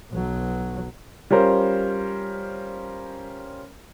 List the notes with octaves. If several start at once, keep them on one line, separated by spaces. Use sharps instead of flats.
B1 F#3
G3 C#4 F4 A#4 C5